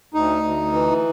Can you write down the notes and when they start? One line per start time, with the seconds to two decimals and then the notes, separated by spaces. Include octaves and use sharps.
0.14 D2 D#4
0.43 D2
0.73 E3